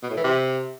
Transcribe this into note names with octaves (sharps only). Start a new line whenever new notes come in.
B2
A2
E3
C3